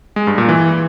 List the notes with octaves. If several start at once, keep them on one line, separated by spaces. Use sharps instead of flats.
G#3
G2
A#2
E3